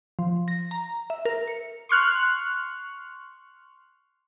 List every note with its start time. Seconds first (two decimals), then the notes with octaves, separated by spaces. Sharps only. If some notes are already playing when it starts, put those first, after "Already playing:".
0.19 F3
0.48 A#6
0.71 A#5
1.10 E5
1.25 A#4
1.47 C#7
1.89 C6 C#6 F6 F#6